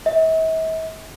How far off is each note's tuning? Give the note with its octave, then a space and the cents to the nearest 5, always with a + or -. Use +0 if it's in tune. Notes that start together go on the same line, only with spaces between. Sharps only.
E5 -45